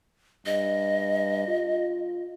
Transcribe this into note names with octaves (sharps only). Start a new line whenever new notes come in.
G2 D#5
F4